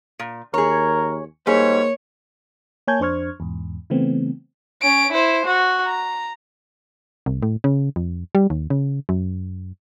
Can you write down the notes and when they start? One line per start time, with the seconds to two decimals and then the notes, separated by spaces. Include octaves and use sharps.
0.19 A#2
0.54 D#2 G#4 A#4 C#5
1.47 G#2 G3 A#3 G#4 C#5
2.87 A#3 C#5 G#5 A5 G6 G#6
3.00 F2 D4 C5 C#6 F6 G#6
3.40 E2 G#2
3.90 C#3 E3 A3 B3 C4
4.82 C#4 D7
5.12 E4 C5
5.45 F#4
5.87 A#5
7.26 C2
7.43 A2
7.64 C#3
7.96 F2
8.35 G3
8.50 D#2
8.70 C#3
9.09 F#2